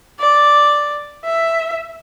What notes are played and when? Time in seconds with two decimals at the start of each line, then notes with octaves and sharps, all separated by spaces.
0.19 D5
1.24 E5